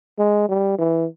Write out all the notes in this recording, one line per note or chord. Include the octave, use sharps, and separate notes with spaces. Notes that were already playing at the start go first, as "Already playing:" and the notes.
G#3
G3
E3